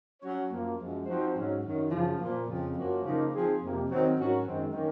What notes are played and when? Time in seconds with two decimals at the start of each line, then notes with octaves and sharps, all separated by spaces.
0.22 F#3 C#4 F#4 C#5
0.50 F#2 F3 A#3
0.79 F#2 F3 G#3
1.06 F3 C4 D#4 F#4 C5
1.35 G#2 F#3 C#4
1.62 F#2 D#3 F#3
1.91 F#2 C#3 F3
2.19 A#2 F3 A#3
2.47 F2 C#3 F3
2.75 F#2 F3 A#3 C#4 F#4
3.03 C#3 F3 A#3 D#4
3.32 F3 C4 D#4 G#4
3.60 F2 C3 F3 A#3
3.88 D#3 F#3 C4
4.16 G#2 F#3 C#4 F#4 A#4
4.44 F#2 D#3 G#3 C4
4.73 D#3 A#3 C#4